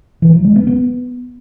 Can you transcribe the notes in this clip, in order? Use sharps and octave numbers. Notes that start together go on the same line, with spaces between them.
E3
F#3
G#3
B3
B3